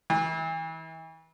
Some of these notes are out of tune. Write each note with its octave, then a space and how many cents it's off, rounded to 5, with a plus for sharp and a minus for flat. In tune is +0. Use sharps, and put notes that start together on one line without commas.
E3 -35